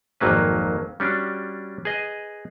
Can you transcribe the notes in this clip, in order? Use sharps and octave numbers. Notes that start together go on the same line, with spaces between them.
G#1 F2 F#3 A#3 B4
G3 C#4 D4 F#4
G#4 B4 D#5